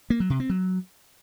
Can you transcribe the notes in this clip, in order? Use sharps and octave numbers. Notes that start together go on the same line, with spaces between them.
A#3
F#3
C3
C4
F#3